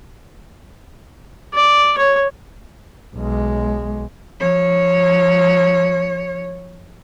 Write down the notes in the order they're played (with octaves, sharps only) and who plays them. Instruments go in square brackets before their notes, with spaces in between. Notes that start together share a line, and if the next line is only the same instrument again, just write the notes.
[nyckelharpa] D5
C#5
[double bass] B1 G#3
[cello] F3 C#5